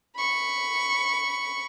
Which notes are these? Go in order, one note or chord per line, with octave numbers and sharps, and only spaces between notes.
B5 C#6